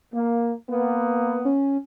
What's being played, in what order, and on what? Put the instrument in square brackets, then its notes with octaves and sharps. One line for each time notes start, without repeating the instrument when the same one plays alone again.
[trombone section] A#3
A#3 B3
[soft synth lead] C#4